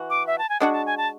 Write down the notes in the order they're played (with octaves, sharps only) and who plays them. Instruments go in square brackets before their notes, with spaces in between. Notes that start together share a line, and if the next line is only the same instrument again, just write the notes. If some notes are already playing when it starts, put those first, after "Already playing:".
Already playing: [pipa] E3 F#4
[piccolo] D6
E5
A5
G#5
[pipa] G#3 D4 F#4 [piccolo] F#5
[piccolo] A5
G#5
A5